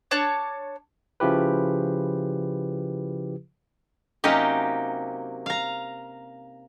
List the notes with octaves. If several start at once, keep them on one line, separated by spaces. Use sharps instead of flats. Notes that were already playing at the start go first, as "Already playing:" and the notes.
D4 C#5 A5 D6
C#3 F3 E4 G4 B4
C3 F#3 A#3 C#4 D#4 G4
F5 A#5